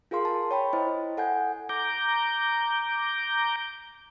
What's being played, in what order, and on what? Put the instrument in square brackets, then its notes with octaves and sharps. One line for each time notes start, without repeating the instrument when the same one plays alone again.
[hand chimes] F4 G#4 A#4 F5 C6
A5
C#5 G5 B5
E4 C5 D#5
A4 F#5 G#5 G6
[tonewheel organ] A#5 D6 G6